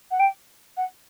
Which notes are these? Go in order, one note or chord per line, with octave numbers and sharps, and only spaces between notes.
F#5
G5
F#5